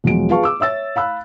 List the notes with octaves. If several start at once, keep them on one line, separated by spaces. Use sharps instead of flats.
E1 F3 F#3 G#3 D7
F4 G#4 B4 F5 A5 C#6
D6 E6
C#5 E5 E6 A6
F5 B5 E6 F#6